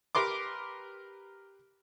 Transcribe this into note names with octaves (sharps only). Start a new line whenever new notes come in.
G4 A#4 B4 C6 D6